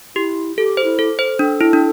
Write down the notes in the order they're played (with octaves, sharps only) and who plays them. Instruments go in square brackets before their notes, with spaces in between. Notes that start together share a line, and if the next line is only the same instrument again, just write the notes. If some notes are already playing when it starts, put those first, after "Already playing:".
[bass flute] E4 [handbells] G4
[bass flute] G4 [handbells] A4
[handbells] C5
[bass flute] E4
[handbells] A4
C5
[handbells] D4 [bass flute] A4
[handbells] E4
D4